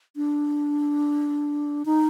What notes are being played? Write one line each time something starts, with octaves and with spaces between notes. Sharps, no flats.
D4
D#4